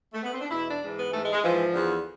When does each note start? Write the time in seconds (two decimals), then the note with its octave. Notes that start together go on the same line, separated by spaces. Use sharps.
0.13 A3
0.23 B3
0.32 C4
0.41 D4
0.50 E2 B2 E4
0.65 D4
0.81 G#2 E3
0.96 B3
1.11 G#2 E3 A3
1.21 G#3
1.32 G#3
1.42 G#2 E3 F3
1.72 E2 D3